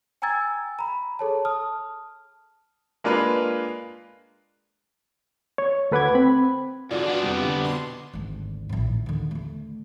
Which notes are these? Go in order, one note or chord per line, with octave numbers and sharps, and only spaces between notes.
G5 G#5 A#5 E6 G#6 A6
A#5 B5
G#4 A4 C#5 A5
A5 D#6 F6
G#3 A#3 D4 F4 B4
C#5
D2 A4 B4 F#5 D6 G#6
C4 B5
G#2 D3 F4 F#4 D5
B3 D4
F2 C3 G3 D6
D3
B2 C6
G#1 D2
A#1 A2
D#3
D#2 D3
D3 A3